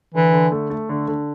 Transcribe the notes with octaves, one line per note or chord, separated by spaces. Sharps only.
D3 E3
D3
A3
A3
D3
D3